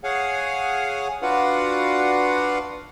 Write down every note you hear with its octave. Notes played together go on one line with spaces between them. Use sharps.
G#4 C#5 F5 F#5 G#5
D4 F4 F#4 B4 F5 F#5